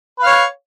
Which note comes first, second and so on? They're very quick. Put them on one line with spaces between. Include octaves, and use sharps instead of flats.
B4 F5 C#5